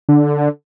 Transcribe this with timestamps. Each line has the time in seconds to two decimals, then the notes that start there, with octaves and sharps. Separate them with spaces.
0.09 D3